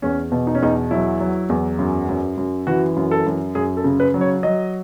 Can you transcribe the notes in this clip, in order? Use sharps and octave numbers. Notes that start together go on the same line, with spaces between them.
E2 C#4
B2
D#4
C#4
E2 D#4
F#3 E4
F#3
E2
F#2
F#2
F#2
E3 F#4
F#2
A4
F#2
F#2 G#4
A4
C#3
B4
F#3
C#5
F#3 D#5